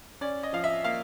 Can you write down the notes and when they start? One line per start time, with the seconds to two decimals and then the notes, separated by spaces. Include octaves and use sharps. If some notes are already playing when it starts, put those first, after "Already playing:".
0.21 C#4 D5
0.43 D#5
0.53 F3 F5
0.64 E5
0.84 A#3 F5